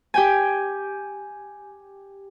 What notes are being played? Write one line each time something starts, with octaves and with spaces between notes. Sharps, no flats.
G4 G5 G#5